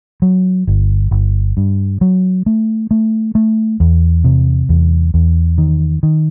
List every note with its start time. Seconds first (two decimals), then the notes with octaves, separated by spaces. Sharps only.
0.22 F#3
0.67 G1
1.11 G1
1.57 G2
2.01 F#3
2.46 A3
2.91 A3
3.35 A3
3.80 E2
4.24 C3
4.69 E2
5.14 E2
5.58 D#3
6.03 D#3